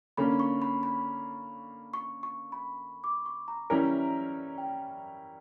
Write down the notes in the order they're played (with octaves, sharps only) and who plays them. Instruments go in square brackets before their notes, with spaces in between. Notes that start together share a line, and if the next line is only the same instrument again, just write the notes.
[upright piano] D3 A#3 C#4 [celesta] B5
[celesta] C#6
B5
B5
C#6
C#6
B5
D6
C#6
A#5
[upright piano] E3 G3 C#4 E4 A#4 [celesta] A#5
[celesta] G5